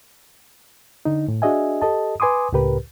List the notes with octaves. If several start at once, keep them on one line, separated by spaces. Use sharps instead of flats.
D3 D#4
A2
D4 F#4 G#4 D#5 E5 G#5
G4 A4 D#5 A5
B4 G#5 C6 D6 D#6
C#2 A2 C#3 G4 A#4 B4